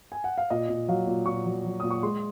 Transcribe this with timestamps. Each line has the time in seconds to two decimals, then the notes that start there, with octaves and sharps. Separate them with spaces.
0.12 G#5
0.24 F#5
0.38 F5
0.50 A#2 D#5
0.69 A#2
0.88 F#3 F5
1.07 A#2
1.26 A#2 C#6
1.46 F#3
1.65 F#3
1.80 A#2 D#6
1.90 C#6
2.03 G#3 C6